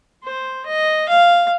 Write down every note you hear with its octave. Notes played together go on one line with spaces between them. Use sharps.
C5
D#5
F5